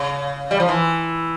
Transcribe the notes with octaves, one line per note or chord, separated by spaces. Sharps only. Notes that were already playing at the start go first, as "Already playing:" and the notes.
Already playing: C#3
G3
F3
E3